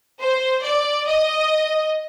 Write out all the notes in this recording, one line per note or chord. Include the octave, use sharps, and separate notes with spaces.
C5
D5
D#5